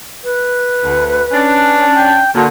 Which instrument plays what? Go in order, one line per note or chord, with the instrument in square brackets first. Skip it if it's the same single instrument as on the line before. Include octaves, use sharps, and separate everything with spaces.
[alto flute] B4
[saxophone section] D2
C#4 D4
[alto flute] G5
[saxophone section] A#2 D3 [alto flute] F#4